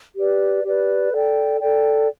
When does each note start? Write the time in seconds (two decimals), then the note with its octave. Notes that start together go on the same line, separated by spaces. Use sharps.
0.16 G4 B4 D5
0.64 G4 B4 D5
1.12 A4 D5 G5
1.59 A4 D5 G5